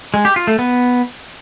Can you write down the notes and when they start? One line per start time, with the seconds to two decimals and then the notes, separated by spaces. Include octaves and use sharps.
0.14 G#3
0.25 G4
0.36 F4
0.47 A3
0.59 B3